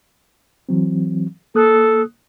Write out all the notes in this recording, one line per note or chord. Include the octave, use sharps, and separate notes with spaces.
E3 F#3 C4
A#3 A4 D#6 F#6